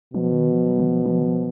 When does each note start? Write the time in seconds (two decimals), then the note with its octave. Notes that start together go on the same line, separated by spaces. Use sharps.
0.14 B2 F3
0.32 D#3
0.51 F3
0.69 F#3
0.80 D#3
0.87 F3
1.06 F3
1.19 D#3
1.24 F3